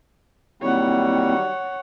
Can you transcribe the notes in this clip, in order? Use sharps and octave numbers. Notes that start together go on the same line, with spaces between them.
D#3 F#3 G3 A#3 C4 E4 C#5 F#5